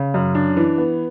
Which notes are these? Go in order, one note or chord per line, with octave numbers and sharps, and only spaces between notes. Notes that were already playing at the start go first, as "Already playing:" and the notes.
Already playing: C#3
F#2
D4
E3
B3